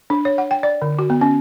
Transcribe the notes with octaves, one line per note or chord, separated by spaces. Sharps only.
D4
C#5
F#5
G5
D5
D3
F#4
B3
C#4